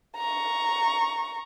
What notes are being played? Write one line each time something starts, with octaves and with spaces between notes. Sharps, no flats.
A#5 C#6